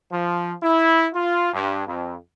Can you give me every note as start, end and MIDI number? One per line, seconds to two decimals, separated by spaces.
0.13 0.53 53
0.63 1.06 64
1.15 1.52 65
1.53 1.87 43
1.87 2.15 41